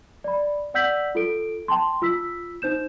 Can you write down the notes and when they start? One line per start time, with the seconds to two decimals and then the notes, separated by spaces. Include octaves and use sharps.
0.24 D5 B5
0.74 D5 F#5 E6 G6 B6 F#7
1.15 F4 A4 D7
1.68 G5 A5 C6
2.02 F4 E6 B6
2.62 D#4 C5 G6 E7